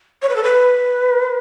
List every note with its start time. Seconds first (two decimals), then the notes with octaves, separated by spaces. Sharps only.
0.22 C#5
0.29 B4
0.36 A4
0.44 B4